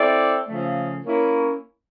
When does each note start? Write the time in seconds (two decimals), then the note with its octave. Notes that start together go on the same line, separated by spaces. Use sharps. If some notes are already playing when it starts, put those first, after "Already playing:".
Already playing: C4 E4 A4 D5
0.48 C#3 F3 A3
1.05 A#3 C#4 E4